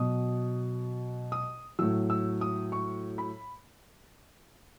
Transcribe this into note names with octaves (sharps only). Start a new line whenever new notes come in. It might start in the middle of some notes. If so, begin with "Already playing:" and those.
Already playing: B2 F#3 D#6
D#6
A2 F#3 E6
E6
D#6
C#6
B5